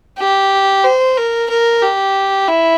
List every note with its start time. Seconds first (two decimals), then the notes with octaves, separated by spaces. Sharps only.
0.19 G4
0.84 C5
1.17 A#4
1.50 A#4
1.82 G4
2.48 E4